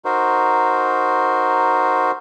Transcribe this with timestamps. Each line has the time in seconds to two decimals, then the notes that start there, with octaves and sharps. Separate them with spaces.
0.05 D#4 F#4 A#4 C5